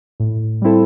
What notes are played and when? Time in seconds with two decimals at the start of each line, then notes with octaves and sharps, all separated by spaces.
0.20 A2
0.62 G3 C4 E4 A4